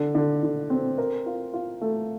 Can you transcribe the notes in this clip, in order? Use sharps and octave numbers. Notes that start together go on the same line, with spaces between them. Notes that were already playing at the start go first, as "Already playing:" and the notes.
Already playing: D3
D3
D3
C4
A#4
F4
F4
A3